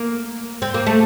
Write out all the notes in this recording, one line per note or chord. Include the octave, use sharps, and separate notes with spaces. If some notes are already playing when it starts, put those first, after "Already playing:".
Already playing: A#3
C4
A#3
A3